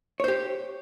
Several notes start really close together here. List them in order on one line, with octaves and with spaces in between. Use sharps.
C#5 C5 G4